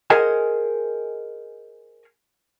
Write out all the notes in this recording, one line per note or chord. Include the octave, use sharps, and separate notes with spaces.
G#4 A#4 C5 D#5 F#5 G#5